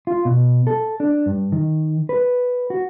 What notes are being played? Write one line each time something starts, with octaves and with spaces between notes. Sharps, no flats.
F4
B2
A4
D4
G2
D#3
B4
F#4